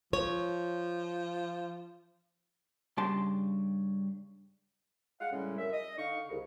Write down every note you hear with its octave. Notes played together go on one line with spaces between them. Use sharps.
F3 C#5
G2 C#3 G4 A5 C6
G#3 F5 F#5
A2 C#3 G3 G#3 C#4
F#2 E5
D#5
D3 D#4 F5 C#6
C2 C#3